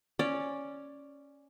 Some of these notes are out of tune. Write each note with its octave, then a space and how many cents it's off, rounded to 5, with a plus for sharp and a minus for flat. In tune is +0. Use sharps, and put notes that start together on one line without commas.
C#4 +0 D5 +0